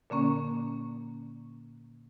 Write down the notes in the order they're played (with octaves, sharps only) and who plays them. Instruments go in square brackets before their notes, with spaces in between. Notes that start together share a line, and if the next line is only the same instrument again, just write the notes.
[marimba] A#2 D3 A#3 C#4